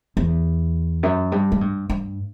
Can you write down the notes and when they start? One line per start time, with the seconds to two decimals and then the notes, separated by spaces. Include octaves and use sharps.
0.17 E2
1.03 F#2
1.32 G2
1.52 G#2
1.61 G2
1.90 G2